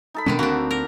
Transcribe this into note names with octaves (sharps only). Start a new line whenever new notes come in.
D#4 A4 B5
B2 D3 D#3 G#3 C#4 D4
D2 A#3 C4 D4 F#4 F#5
A#4